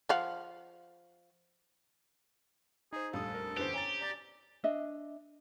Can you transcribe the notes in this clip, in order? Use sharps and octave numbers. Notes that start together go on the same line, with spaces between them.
F3 F5 F#5
D#4 G#4 C5
F1 A#1 G3 A4 F5 D#6
A#4
F#1 E2 D3 G4 B4 C5
C#5 G#5 A#5 A6
D5 A#5 A6
D4 D#5 E5